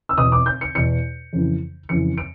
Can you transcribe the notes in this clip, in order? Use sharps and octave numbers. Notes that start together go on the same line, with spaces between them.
E6
E2 B2 D#6
D6
G6
C#7
E2 B2 C#7
F2 C#3 E3
F2 C#3 E3 C#7
D7